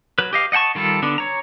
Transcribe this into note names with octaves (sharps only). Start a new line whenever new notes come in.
F#3 B4
G4 D#5 F5
D#5 F#5 G5 A5 C#6
D#3 G3 F4 A4
D3 B3 D4
C#5 A#5